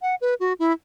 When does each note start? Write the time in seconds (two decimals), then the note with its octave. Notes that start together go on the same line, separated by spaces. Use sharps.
0.02 F#5
0.21 B4
0.40 F#4
0.59 E4